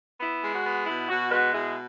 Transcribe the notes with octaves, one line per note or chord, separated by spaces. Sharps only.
B3 E4
G#3
F#4
B3
B2 E4
B2 F#4
G#3 F#4 B4
B2 E4 G#4